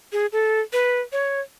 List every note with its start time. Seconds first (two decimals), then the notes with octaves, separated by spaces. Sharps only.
0.12 G#4
0.32 A4
0.73 B4
1.12 C#5